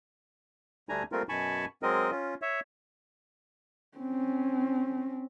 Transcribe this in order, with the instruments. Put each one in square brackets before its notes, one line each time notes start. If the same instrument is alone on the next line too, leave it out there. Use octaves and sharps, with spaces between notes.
[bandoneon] D2 G3 A3 D4 G#5 A#5
G3 A3 A#3 C4 F4 A#4
F#2 B2 G#5 A5 B5 C#6
F#3 G#3 C4 A#4 D#5
C#4 F4
C#5 E5
[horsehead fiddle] C4 C#4